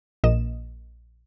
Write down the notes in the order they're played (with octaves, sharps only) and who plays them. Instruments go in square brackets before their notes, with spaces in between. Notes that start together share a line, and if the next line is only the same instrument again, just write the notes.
[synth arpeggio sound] A#1 A#3 D#5 E7